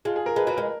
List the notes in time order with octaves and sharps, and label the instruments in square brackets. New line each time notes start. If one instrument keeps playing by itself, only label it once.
[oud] G#3 [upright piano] F4
[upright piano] G#4
A#4
[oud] G#3 [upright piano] B4
[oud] F#3 [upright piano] B4
[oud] G#3 [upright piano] A#4